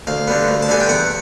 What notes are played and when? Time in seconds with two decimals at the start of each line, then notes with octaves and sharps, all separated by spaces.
0.07 D2 F5
0.27 D3 G3 B3
0.48 D2
0.62 A5
0.68 D3 G3 B3 G#5
0.80 G5
0.89 E2 F#5